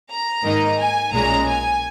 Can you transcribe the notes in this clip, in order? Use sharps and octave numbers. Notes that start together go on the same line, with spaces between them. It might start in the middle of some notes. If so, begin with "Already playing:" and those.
A#5
G#2 D#3 A#3 D#4
G#5
B1 A#2 G#3 C#4 A#5
G#5